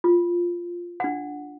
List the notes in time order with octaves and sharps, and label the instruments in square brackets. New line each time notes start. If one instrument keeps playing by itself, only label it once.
[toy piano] F4
D4 F#5